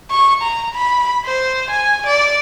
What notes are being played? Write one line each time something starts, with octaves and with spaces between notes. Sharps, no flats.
C#6
A#5
B5
C5
G#5
D5